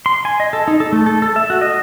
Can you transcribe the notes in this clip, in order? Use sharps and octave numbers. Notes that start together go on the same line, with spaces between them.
C6
G#5
D#5
A4
D#4
A4
A3
A4
A4
E5
F#4
D#5